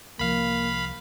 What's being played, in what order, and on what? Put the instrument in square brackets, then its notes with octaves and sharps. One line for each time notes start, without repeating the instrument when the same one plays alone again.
[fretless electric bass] C2 F3 [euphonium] A#3 [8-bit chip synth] F5 B5